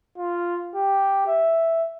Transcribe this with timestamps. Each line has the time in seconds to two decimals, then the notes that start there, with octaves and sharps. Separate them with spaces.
0.18 F4
0.76 G4
1.27 E5